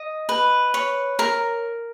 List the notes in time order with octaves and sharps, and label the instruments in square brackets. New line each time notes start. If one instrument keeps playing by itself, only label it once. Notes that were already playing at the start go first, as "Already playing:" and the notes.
Already playing: [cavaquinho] D#5
B4
C#5
A#4